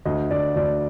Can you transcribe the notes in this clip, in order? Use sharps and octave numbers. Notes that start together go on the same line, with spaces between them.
D2 D#5
D2 D5
D2 D5